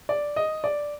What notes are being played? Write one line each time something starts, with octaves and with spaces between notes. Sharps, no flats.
D5
D#5
D5